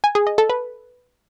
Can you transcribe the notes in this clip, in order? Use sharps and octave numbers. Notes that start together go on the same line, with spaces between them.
G#5
G#4
D#5
A4
B4